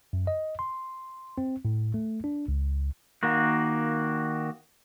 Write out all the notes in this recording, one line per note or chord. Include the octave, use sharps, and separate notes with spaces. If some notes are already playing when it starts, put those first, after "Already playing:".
F#2
D#5
C6
C4
A2
A3
D4
C#2
D#3 A#3 F#4